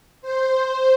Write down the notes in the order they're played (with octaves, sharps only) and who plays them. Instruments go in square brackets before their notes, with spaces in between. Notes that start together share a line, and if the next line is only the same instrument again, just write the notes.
[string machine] C5